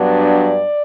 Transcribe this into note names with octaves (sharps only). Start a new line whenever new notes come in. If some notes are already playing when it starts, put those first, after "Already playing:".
Already playing: G2 F#3 B3 D4
D5